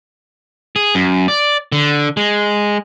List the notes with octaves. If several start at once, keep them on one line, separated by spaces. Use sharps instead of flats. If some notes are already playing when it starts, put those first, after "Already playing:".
G#4
F#2
D5
D3
G#3